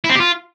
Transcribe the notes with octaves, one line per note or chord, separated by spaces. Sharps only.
E4
C4
G4
F4